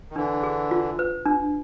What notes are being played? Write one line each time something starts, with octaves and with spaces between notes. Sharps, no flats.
D#3
D3 E3 D4
G#4
F4
B4
D4